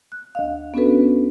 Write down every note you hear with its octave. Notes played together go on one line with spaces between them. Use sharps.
F#6
D2 D#5 F5
B3 C#4 D4 F#4 A4 B4